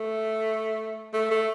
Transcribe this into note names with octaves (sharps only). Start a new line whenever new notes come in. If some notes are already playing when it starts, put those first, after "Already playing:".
Already playing: A3
A3
A3